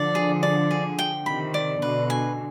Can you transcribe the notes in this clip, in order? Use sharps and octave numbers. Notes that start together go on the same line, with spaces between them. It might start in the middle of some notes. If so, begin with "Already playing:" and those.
Already playing: D3 F3 D5
G#4
D5
G#4
G5
C3 D#3 B5
D5
B2 D3 B4
G#5